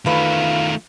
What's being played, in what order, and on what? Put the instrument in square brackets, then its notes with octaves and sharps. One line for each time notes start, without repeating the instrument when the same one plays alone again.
[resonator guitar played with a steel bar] E2 B4 [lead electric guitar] D#3 A3 [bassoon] F4